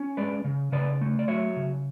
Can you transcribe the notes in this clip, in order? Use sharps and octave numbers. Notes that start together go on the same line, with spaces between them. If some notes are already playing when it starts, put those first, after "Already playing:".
Already playing: C#4
G#3 B4 D5
C#3
C#3 B4 D5
A3
D5
F#3 C#5 E5
C#3